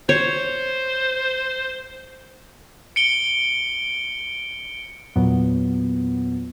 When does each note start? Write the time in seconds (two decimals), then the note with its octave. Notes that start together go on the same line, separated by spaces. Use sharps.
0.09 C5 C#5
2.96 C#7 D7 G7
5.16 E2 A#2 F#3 B3